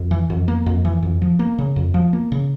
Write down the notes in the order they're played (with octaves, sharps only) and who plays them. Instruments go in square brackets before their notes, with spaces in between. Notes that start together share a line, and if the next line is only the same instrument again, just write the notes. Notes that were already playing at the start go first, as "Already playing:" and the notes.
Already playing: [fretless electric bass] F2
E3
F2
A#3
F2
E3
F2
F3
A#3
C#3
F2
F3
A#3
C#3